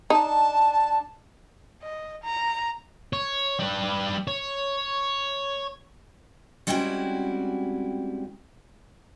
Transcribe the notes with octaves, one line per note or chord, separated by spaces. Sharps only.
D4 D#4 A5
D#5
A#5
C#5
G3 B4
C#5
G3 G#3 C4 C#4 E4 F#4